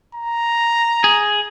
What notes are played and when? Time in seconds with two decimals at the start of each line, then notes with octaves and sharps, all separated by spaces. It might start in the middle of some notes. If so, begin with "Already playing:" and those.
0.15 A#5
1.04 G#4